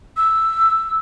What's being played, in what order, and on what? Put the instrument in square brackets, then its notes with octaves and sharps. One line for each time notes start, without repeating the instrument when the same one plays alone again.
[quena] E6